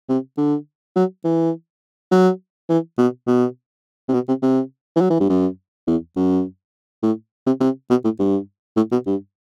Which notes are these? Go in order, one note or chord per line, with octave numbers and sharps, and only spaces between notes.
C3
D3
F#3
E3
F#3
E3
B2
B2
C3
B2
C3
C3
E3
F#3
E3
G2
F#2
E2
F#2
A2
C3
C3
B2
A2
G2
A2
B2
G2